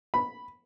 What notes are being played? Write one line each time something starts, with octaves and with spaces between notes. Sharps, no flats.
B5